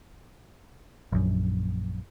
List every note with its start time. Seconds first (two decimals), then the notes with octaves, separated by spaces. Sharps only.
1.12 A#1 F#2